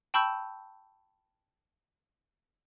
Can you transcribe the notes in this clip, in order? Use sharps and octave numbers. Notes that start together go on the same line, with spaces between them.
G5 A5 B5 C#6 E6 G6